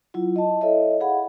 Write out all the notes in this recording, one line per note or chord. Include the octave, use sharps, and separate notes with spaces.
F#3 E4 F4
D#5 A5
E4 A4 C#5 D#5 E5
G#4 F5 F#5 B5